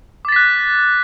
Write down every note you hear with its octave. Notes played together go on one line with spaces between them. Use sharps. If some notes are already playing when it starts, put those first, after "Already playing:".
D6 F#6 A6 B6